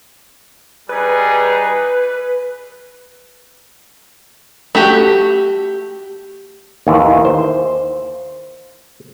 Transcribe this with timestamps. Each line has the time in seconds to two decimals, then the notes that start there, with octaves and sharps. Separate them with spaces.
0.89 G3 D#4 G#4 B4
4.75 A3 F#4 G4
6.87 D#2 D#3 E3
7.25 C5